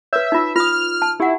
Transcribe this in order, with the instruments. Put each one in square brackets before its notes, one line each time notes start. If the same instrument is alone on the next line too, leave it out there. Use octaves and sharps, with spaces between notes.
[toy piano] B4 C#5 [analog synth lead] E5
[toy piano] D#4 F4
[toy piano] F4 D#6 [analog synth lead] F6
[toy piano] A5
[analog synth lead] E4 [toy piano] G4 F#5